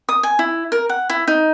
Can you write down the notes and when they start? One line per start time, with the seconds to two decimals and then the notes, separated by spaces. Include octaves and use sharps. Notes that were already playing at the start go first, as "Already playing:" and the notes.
0.09 D#6
0.23 G#5
0.39 E4
0.72 A#4
0.89 F#5
1.10 E4
1.27 D#4